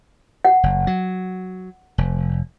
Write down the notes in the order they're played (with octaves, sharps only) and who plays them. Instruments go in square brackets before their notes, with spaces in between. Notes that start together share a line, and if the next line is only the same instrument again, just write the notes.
[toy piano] F#5
[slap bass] F#1
F#3
F1